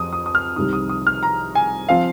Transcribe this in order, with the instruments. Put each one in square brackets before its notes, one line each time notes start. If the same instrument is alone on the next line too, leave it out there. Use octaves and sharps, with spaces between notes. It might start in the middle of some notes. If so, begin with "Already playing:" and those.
Already playing: [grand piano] F2 D#6
D#6
D#6
F6
C2 C3 D#3 D#6
D#6
D#6
F6
A#5
G#5
F3 C4 F5